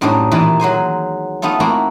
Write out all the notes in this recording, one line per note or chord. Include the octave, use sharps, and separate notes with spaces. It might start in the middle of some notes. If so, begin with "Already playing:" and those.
F#2 A2 G3 C4 D4 D#4
A#2 D#3 E3 A5 B5
F#3 G#3 C5 G#5
A3 B3 D#4 F4 A4
A3 A#3 C4 E4 F#4